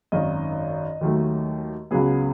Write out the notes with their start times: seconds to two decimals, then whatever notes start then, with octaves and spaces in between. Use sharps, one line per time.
0.12 G#1 F#2 D#3 D#5
1.01 D#2 D#3 F#3 A3
1.91 C#2 C#3 F#3 B3 G#4